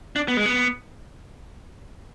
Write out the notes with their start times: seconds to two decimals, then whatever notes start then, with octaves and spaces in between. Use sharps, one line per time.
0.16 D4
0.28 B3
0.37 G#3
0.45 B3